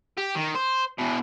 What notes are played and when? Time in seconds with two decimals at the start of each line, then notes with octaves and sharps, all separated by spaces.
0.18 G4
0.36 D#3
0.55 C5
0.99 E2 B2